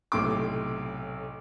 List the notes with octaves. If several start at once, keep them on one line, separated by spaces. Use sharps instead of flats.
B1 A2 C3 C6 D6